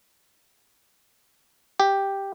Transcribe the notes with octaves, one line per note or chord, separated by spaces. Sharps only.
G4